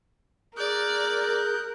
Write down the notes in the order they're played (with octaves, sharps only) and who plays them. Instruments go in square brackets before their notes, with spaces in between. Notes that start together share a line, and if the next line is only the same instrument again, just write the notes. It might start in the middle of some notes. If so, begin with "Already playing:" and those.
[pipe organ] G#4 [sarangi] A#4 [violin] D5 [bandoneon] F#6 G6